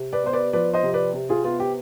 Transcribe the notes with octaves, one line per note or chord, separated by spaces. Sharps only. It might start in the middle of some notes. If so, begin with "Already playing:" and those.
Already playing: C3
B4 D5
B3 C5
B4 D5
F3 B4 D5
C5 D#5
C3
B4 D5
C3
F4 G#4
B3 F4
G4